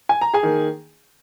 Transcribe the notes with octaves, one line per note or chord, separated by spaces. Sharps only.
G#5
A#5
G#4 G#5
D#3 A#3